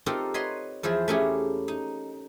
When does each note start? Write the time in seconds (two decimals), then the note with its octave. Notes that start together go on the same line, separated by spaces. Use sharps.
0.06 C4 D#4 F4 G4 A4 A#4
0.34 B4 C#5 D#5 F#5 A#5 C6
0.83 E2 F3 E4 G#4 C5
1.08 A3 A#3 C#4 E4 G4 G#4
1.68 D#4